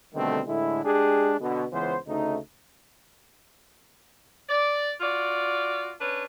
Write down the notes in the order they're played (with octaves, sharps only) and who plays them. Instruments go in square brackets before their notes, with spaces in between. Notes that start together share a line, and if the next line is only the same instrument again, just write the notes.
[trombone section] B2 D3 D#3 G3 A3 C4
A2 D3 G#3 E4
G#3 D4 G4 G#4
B2 D3
C#2 E3 B3 C#4 C5
D2 C#3 A3 D#4
[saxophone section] D5
F4 F#4 D5
C#4 D4 B4